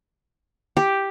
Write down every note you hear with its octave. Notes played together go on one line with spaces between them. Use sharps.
G4